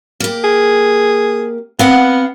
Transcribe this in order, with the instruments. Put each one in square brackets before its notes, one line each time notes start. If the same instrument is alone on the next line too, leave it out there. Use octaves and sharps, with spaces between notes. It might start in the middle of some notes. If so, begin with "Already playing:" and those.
[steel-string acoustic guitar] A#3 G4
[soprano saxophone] G#4
[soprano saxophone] B3 [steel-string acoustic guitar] C4 F5 F#5